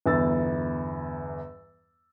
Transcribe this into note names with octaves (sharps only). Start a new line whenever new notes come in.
G1 E2 E6 A6